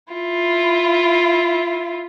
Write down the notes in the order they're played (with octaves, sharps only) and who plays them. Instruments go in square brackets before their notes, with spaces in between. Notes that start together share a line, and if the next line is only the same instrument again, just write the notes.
[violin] E4 F4